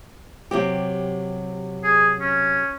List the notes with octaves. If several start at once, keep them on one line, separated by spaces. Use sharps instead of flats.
C3 F#3 G4
G#4
C#4